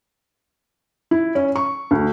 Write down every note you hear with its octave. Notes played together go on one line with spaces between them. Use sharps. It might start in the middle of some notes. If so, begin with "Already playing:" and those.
E4
C#4
C#6
D2